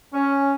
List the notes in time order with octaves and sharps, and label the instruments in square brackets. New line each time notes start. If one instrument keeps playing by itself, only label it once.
[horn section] C#4